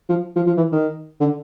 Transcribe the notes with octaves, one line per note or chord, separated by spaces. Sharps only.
F3
F3
F3
E3
D#3
D3